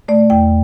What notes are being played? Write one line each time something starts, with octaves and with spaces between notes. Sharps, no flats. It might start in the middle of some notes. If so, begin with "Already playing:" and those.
B2 A3 D5
E2 G5